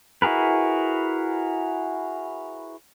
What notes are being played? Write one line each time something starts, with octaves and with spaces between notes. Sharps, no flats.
E4 F#4 G#4 A#4 B4